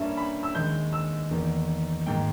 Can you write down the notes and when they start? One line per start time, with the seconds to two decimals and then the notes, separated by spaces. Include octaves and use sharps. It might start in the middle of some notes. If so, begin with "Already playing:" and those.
Already playing: G2 G3 A#3 C#4 E5
0.17 B5
0.43 E6
0.55 D#2 D#3 G#3 G6
0.93 E6
1.31 E2 D#3 A#3
2.07 G#2 D#3 A#3 G5